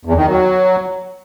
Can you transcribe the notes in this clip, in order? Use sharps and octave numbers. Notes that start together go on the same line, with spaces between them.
E2
D#3
F#3